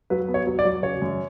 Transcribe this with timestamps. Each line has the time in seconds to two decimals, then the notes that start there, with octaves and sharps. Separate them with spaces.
0.10 F#3 B4
0.28 B3
0.34 C#5
0.47 F#3
0.59 D5
0.65 F#3
0.82 C#3 C#5
1.02 F#2